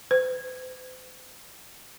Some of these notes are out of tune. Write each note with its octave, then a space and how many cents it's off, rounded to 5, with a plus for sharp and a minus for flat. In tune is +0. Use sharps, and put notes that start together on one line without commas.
C5 -45